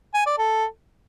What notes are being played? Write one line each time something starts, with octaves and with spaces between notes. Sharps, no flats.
G#5
D5
A4